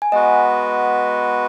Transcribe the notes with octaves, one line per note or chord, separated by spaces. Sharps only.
G#5
G#3 B3 F#4 B4 D#5 F#5